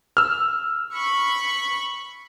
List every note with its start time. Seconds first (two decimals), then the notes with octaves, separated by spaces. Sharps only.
0.17 E6 F6
0.94 B5 C#6